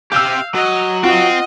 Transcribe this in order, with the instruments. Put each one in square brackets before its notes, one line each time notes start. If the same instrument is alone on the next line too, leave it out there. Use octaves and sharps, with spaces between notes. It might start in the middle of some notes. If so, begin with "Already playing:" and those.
[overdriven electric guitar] G4 E5 [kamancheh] F5 [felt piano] E6 G6
[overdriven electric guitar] F#3 [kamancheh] D#5
[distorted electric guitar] C4 [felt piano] F4 [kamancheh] D#5 F#5